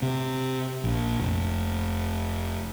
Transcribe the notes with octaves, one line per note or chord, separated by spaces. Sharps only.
C3
A#1
F1